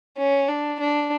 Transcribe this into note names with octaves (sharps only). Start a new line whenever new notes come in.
C#4
D4
D4